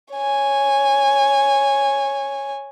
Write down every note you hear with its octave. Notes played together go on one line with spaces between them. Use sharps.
C#5 G#5